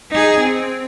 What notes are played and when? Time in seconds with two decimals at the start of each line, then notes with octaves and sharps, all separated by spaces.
0.11 D#4 G#4
0.40 C4